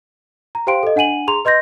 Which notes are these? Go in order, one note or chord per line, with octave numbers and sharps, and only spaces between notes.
A#5
G4 C5 F5 G5 C6 D7
A4 D#5
D4 F#5 G#5 D#7 F#7
G#4 A#5 C6 F7
B4 D#5 C6 G6 A#6